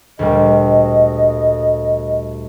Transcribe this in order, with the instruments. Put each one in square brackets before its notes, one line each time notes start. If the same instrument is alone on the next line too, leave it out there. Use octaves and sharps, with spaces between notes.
[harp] D2 A#2 G3 [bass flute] D#5